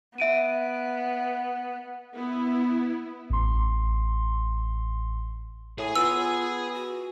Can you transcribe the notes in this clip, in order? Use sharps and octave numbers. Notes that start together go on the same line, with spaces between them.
B3 E5 D7 D#7
B3 E4
A1 C6
A2 G#4 G#5
B3 F4 E6
F#4